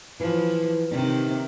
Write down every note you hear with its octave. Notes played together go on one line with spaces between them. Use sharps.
E3 F3
C3 D#3 D#4